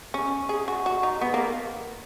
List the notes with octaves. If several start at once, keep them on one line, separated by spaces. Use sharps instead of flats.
C#4
G#4
F#4
F#4
D#4
B3
A#3